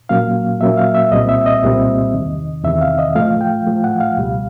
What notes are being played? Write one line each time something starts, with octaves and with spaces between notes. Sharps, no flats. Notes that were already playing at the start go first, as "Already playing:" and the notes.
A#2 F#3 A#3 C#4 F5
A#2 F#3 A#3 C#4 E5
F5
E5
C2 A#2 G3 C4 D#5
E5
D#5
C2 A#2 G3 C4
E2 C3 D#3
E2 C3 D#3 E5
F5
D#5
A2 F3 A3 F5
G5
A2 F3 A3
F#5
F5
C#2 B2 G3